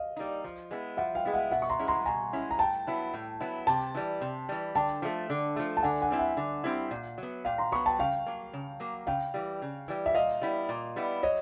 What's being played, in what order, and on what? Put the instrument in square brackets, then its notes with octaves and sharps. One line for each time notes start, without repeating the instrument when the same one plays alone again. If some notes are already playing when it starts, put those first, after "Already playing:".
Already playing: [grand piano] D#5 F5
[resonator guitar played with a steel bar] G3 A#3 D#4
F3
G#3 B3 E4
[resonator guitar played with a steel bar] F3 [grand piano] E5 F#5
[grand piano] F5 G5
[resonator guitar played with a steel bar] G#3 B3 E4
[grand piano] E5 F#5
[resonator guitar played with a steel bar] B2 [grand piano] E5 F#5
[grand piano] C#6
A#5 C6
[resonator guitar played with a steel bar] G#3 C#4 E4
[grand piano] A#5 C6
[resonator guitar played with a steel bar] B2 [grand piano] G#5 A#5
[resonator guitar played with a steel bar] G#3 C#4 E4
[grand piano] A#5
[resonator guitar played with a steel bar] A2 [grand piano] G5 A5
[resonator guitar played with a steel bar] F#3 B3 E4
A2
F#3 B3 E4
[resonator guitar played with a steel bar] C3 [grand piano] G5 A5
[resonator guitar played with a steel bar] E3 G3
C3
E3 G3
[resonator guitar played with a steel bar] D3 [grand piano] G5 A5
[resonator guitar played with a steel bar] F3 A3
D3
F3 A3
[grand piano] A5
[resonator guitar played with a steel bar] D3 [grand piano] F#5 G#5
[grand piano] F#5 G#5
[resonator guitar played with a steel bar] G3 C4 E4
[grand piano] E5 F#5
[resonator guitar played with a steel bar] D3
G3 C4 E4
A#2
F#3 B3
[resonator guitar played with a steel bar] A#2 [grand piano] F5 G5
[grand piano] A#5 C6
[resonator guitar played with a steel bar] F#3 B3 [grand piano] B5 C#6
[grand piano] G5 A5
[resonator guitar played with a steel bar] C#3 [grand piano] F5 G5
[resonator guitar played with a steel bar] F#3 A#3
C#3
F#3 A#3
[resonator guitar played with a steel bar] C#3 [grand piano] F5 G5
[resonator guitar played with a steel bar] E3 G3
C#3
E3 G3
[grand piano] E5
[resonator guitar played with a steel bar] A#2 [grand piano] D#5 F5
[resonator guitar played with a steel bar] G3 B3 E4
A#2
G3 B3 E4
[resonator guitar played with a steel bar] F#3 [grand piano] C#5 D#5